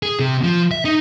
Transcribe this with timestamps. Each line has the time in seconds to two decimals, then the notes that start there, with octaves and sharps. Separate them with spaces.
0.03 G#4
0.19 C3
0.43 F3
0.71 E5
0.85 D#4